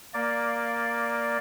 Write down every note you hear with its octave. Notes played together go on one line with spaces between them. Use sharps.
A#3 D5